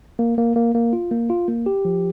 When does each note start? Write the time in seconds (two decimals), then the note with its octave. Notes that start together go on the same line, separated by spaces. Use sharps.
0.19 A#3
0.38 A#3
0.56 A#3
0.75 A#3
0.93 F4
1.11 A#3
1.30 F4
1.48 A#3
1.66 G4
1.85 F3